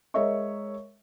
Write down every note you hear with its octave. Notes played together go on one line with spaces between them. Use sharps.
G#3 A#4 C#5 D#5 E5 C#6